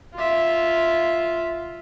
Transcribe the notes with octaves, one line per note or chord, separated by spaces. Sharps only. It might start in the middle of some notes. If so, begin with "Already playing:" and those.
F4 E5